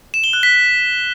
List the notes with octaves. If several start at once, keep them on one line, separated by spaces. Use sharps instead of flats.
E7
G7
F#6
B6